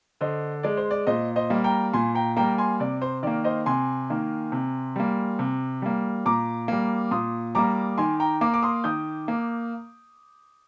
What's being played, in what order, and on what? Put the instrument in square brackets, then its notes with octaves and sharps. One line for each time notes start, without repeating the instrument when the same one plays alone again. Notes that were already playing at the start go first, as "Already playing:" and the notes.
[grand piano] D3 C5 D#5
G#3 D5
C5
D5
A#2 C5 D#5
C5 D#5
G3 A#3
G5 A#5
A#2 G#5 C6
G5 A#5
G3 A#3 G5 A#5
G#5 C6
C3 D5
C5
D#3 A#3 D5
C5 D#5
C3 G#5 C6
D#3 A#3
C3
G3 A#3
C3
G3 A#3
A#2 A#5 D6
G3 A#3
A#2 C6 D#6
G3 A#3 A#5 D6
D#3 G#5 C6
G5 A#5
A#3 A#5 D6
D6
C6 D#6
D#3 D#6 G6
A#3